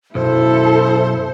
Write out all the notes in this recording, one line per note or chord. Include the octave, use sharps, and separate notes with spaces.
B1 F#2 E4 A4 C5